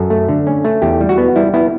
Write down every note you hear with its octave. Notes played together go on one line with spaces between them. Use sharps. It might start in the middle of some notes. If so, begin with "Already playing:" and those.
Already playing: F#2 A4
A3
D3
C#4
A3
E2 G4
G3
F#4
B3
G3 E4
B3 E4